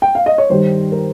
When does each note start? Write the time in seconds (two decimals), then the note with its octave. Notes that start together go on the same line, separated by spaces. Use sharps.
0.02 G5
0.15 F5
0.26 D#5
0.38 C#5
0.50 G2 D#3 G3 C5
0.92 A#4